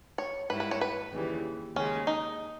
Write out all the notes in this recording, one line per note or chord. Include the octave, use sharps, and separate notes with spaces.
C#5
G#2 G3 A#3 E4 B4
B4
C#5
B4
D#2 C#3 E3 G3
D#2 C#3 G#3 C#4
D#4